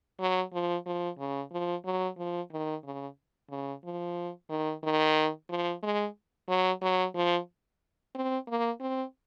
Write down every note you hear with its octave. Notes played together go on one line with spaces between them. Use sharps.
F#3
F3
F3
C#3
F3
F#3
F3
D#3
C#3
C#3
F3
D#3
D#3
F3
G#3
F#3
F#3
F3
C4
A#3
C4